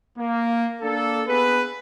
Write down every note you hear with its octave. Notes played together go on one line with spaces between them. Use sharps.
A#3
A#3 D4 A4
B3 G#4 B4